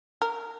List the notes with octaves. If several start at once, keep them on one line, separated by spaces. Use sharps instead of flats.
A#4